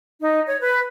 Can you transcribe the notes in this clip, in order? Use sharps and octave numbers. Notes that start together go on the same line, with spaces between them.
D#4
C#5
B4